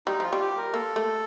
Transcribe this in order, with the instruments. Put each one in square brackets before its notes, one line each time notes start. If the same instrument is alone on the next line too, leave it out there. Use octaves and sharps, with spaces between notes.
[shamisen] G3 [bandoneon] D#4
[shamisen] F3 [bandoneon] F4
[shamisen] G3
[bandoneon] G4
A#4
[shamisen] A#3 [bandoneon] A4
[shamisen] A3